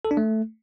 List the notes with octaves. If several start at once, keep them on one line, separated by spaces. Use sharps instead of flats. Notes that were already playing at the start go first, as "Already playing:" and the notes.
A4
D4
A3